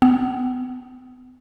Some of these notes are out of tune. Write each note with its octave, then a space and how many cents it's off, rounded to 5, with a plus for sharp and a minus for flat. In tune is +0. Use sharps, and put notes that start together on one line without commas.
B3 +35